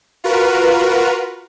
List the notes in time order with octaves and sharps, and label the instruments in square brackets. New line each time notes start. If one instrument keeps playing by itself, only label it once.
[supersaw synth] F4 F#4 A#4 B4